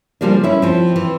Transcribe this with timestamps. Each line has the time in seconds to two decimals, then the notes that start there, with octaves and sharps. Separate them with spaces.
0.21 C#3 F3 G3 A#3 D4
0.44 C#4 E4
0.62 F3 C4
0.96 E3